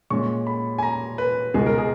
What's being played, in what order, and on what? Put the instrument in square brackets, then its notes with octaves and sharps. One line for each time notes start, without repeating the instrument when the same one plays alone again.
[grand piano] A#2 G#3 C#4 C#6
B5
G#5
A#5
B4
C#2 B2 G#3 G#4
A#4
G#4